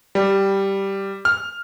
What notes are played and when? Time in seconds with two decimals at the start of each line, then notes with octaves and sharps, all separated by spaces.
0.15 G3
1.25 F6